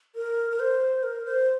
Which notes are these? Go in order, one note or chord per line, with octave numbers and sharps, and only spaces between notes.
A#4
A#4
C5
A#4
C5